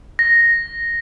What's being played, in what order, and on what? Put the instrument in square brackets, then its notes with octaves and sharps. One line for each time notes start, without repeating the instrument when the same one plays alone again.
[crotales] A#6